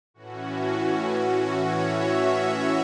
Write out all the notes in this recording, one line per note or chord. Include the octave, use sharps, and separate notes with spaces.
A2 E3 C#4 F#4
C#5
E5